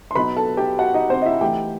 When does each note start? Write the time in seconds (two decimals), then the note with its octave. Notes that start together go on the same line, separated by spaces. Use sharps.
0.11 C6
0.15 B2 F#3 B3 D#4 B4 B5
0.37 A4 A5
0.57 G4 G5
0.79 F#4 F#5
0.94 D#4 D#5
1.10 C4 C5
1.22 D#5
1.26 E4 E5
1.41 E3 A3 D#4 G4 G5